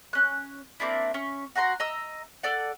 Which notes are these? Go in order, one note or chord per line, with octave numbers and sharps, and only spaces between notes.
C#4 F#6
A#3 C4 D4 E4
C#4 C#6
F#4 F#5 A#5 C6
D#5 A#5 E6
A4 D5 F#5